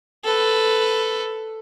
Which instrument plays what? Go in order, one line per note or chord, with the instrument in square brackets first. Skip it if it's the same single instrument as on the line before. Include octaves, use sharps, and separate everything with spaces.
[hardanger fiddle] A4 B4